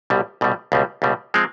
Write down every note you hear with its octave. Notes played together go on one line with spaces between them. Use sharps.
C2 B2 G3
C2 B2 G3
C#2 B2 G3
C#2 B2 G3
F3 G#3 C4